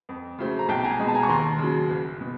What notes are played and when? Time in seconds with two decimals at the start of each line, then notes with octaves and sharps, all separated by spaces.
0.09 F2
0.38 C#3 F#3 A3 C4
0.59 A#5
0.68 B1 G5 A5
0.84 G#5 A#5
0.99 B2 G#3
1.08 A5
1.15 G#5 A#5
1.23 C#6
1.29 D#2 A#5 C6
1.58 C#3 F#3
1.89 F#1
2.21 B2